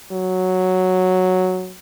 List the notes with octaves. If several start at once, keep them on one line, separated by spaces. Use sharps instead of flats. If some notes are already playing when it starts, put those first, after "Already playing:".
F#3